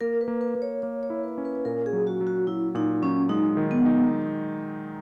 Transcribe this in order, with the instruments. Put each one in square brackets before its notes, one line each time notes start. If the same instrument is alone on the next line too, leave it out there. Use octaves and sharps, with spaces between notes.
[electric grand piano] A#3 [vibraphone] A#4
[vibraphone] B4
[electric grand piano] A#3
[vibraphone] B4
[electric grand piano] A#3
[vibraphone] C#5
[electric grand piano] A#3 [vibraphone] C#5
[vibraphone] C#5
[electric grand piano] E4
[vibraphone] B4
[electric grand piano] C#4
[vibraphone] B4
[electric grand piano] A#2 [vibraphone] A#4
[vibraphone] G#4
[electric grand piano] F#3
[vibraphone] F#4
[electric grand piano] F#3
[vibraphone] F#4
[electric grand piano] F#3 [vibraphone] E4
[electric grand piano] A#2 [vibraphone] D#4
[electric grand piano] F#3 [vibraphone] C#4
[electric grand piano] G#3 [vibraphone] D#4
[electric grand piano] D#3
[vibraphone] B3
[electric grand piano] D#4